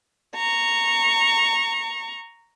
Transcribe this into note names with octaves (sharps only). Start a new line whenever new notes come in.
A#5 C#6